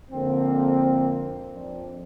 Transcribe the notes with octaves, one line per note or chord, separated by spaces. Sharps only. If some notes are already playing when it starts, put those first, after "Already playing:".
F2 D3 A#3 C4
F2 F3 C4 D4